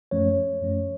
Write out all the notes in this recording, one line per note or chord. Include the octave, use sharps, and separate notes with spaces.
F#2 F3 A3 C#4 C#5
F#2 F3 A3 C#4